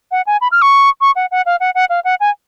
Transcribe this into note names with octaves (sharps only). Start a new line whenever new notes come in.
F#5
G#5
B5
F6
C#6
C#6
F#5
F#5
F5
F#5
F#5
F5
F#5
G#5